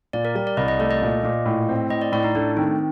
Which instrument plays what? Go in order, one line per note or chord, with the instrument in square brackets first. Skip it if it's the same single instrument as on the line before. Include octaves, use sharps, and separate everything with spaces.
[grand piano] A#2 [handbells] D5
[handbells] A#4
[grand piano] G3 [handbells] D5
[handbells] D5
[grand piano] C2 [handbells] D#5
[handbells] D#5
[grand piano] A3 [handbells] D5
[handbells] D#5
[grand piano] A#2
A#2
A2
C4
[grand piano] A2 [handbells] D#5
[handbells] D5
[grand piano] A2 [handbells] D5
[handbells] D#4
[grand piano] A3 [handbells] D4
[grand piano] D#3 [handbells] C4